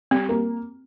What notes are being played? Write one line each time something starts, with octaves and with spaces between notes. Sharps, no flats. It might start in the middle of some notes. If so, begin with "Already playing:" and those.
G3 C4
A#3